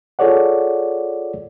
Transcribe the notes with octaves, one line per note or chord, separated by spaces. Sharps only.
F4 G#4 A4 C#5 D5 F#5